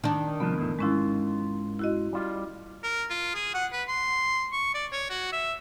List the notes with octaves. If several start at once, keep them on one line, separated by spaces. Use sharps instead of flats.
D#3 D4
C2 F3 B3
E2 A2
G#2 G#3 C#4 E4 F4
E4 F#4 D#5
G3 F4
A#4
F4
G#4
F#5
B4
C6
C#6
D5
C#5
F#4
E5